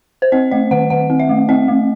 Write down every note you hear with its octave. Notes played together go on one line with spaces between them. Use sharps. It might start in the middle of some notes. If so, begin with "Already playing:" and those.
C5
C4 D#5
A3 D#5
D#3 F#5
D#3 F#5
C4
E5
A3
C4 D#5
A3